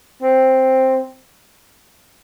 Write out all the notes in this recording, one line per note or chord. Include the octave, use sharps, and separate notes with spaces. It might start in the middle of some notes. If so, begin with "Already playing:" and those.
C4